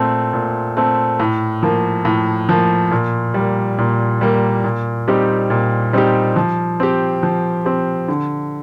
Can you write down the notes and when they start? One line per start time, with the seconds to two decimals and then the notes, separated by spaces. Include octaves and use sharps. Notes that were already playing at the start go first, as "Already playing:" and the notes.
Already playing: A#2 A3 C4
0.33 A#2
0.77 A3 C4
1.20 A2
1.63 F3 A#3
2.05 A2
2.49 F3 A#3
2.91 A#2
3.34 G3 A#3
3.78 A#2
4.21 G3 A#3
4.64 A#2
5.08 G3 C4 D#4 G4
5.50 A#2
5.93 G3 C4 D#4 G4
6.36 F3
6.80 C4 G4
7.23 F3
7.65 C4 G4
8.08 D3